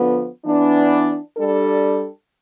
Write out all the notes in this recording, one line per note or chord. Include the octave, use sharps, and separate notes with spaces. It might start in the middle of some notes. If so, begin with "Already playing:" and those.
Already playing: D3 F3 B3
E3 B3 D4
G3 D4 A4